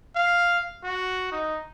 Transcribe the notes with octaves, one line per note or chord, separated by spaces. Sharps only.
F5
F#4
D#4